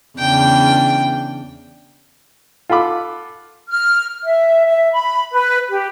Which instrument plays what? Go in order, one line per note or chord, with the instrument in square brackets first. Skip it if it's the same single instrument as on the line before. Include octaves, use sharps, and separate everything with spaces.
[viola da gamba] E2 C#3 D4 [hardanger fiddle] G5
[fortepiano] F4 A4 F#5 B5 D6
[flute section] F6
E5
E5
B5
B4
G4